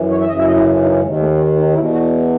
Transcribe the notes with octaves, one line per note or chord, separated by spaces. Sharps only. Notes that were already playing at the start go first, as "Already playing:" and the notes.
Already playing: F#2 E3
C#5
E5
F#2 C#3 E3 D#5
E5
D#5
E4
D#4
D#2 D#3 G#3
A3
C#4
D#4
E2 B2 E4
F#4